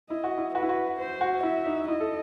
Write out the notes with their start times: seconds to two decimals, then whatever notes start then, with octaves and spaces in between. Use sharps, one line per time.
0.10 E4 D#5
0.24 F#4
0.38 E4
0.55 F#4 B4
0.62 E4
0.69 F#4
0.99 C5
1.21 F#4
1.43 E4 E5
1.66 D#4
1.88 E4 D#5
2.00 A4